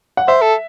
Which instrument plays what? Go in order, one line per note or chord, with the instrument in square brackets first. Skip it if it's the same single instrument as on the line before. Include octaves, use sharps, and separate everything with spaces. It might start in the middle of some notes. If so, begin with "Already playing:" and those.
[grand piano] F#5
[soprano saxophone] C5 [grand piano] E5
[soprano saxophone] A4